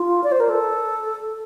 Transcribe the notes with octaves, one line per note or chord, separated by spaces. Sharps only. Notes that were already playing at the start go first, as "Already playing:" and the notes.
Already playing: F4
D5
C5
A#4
A4